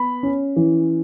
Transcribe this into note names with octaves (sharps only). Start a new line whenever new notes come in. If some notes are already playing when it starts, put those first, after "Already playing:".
Already playing: B3 B5
C#4
E3